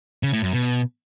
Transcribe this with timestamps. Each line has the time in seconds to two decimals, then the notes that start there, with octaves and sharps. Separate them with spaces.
0.23 C#3
0.33 A2
0.43 F#2
0.53 B2